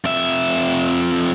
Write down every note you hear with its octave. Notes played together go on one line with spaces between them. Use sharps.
F2 E5